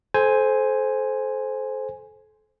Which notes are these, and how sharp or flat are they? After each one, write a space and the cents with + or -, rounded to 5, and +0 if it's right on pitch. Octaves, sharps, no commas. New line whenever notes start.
A4 -30 C5 +0 G#5 +0